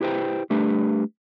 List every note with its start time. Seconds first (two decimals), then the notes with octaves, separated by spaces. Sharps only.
0.01 E4 G4 B4 C5 G5
0.50 G3 A3 D4 G4 B4